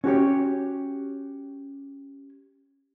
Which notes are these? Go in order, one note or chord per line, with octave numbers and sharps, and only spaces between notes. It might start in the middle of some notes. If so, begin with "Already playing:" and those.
C#4 F#4 G4 C#5